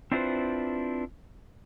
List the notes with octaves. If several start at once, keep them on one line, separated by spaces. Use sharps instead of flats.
C4 D4 E4 F4 B4 C5